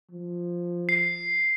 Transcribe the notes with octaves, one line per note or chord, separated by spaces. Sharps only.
F3
C7